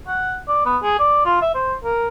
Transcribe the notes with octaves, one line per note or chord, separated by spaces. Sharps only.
F#5
D5
B3
G#4
D5
F4
E5
C5
A#4